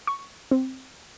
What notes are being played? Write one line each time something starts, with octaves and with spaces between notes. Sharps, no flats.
C#6
C4